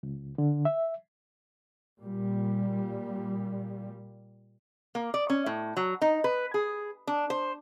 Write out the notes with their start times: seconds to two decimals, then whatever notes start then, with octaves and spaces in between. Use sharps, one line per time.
0.03 C#2
0.38 D3
0.65 E5
2.01 A#2 G3
4.95 A#3
5.14 D5
5.30 C#4
5.46 A2
5.77 F#3
6.02 D#4
6.24 B4
6.54 G#4
7.07 D4
7.30 C5